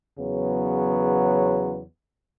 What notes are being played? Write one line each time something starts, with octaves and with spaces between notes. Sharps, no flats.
E2 C#3 F#3 B3